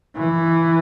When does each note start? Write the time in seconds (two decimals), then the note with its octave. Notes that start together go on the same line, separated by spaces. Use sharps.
0.16 E3